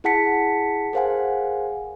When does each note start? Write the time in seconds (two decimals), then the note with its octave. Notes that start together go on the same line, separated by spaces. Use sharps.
0.04 E4 G#4 F#5 A5 B6 C#7
0.93 G#4 A#4 C5 F5 F#5 G#5